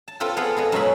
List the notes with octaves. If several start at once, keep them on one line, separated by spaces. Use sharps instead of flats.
A5
C4 F4 A4 B4 G5
B3 G#4 A4 F5 F#5
B3 G#4 D#5
F#2 B2 G#3 C#4 G#4 B5